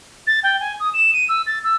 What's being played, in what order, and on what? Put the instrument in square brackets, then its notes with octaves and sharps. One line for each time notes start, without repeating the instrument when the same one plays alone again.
[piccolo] A6
G5
G#5
D#6
E7
D#7
E6
A6
E6